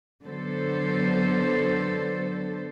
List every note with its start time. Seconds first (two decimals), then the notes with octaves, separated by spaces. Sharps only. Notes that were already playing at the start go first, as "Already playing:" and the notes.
0.24 D3 F#3 B3 A4 C5